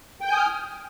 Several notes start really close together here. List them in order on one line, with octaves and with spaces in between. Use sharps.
G5 G6 G#5 D#6 F6